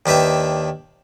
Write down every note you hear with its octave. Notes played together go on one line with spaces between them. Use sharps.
D#2 D4 B4 E5 G5